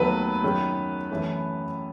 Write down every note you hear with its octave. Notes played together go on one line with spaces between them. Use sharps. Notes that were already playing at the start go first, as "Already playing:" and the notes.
Already playing: D#2 D#3 F#3 A3 B3 B4
F#2 D#3 F#3
F#2 E3 A3